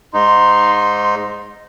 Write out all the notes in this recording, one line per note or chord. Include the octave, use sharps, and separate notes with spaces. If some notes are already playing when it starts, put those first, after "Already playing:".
G#2 D#4 C6